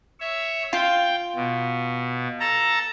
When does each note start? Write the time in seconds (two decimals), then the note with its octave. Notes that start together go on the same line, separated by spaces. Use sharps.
0.20 C#5 E5
0.73 F4 G5
1.35 B2
2.40 A4 A5 A#5